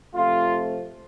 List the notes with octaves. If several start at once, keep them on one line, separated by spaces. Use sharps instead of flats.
C3 F3 A3 C4 F4